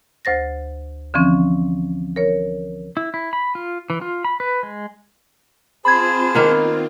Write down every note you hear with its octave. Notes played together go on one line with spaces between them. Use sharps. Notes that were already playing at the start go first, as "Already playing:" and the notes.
D2 C5 A6 A#6
D3 E3 F3 C4 C#4
A#4 C#5
E4
E4
B5
F4
E3
F4
B5
B4
G#3
C4 F4 G#4 C5 A5 B5 G#6
D#3 A#3 B3